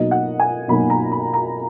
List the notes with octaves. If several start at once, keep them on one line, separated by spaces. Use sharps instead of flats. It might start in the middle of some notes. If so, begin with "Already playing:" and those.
Already playing: B2 F#3 A#3 D#4 D#5
F#5
G#5
B2 F#3 A#3 D#4 B5
A#5
B5
A#5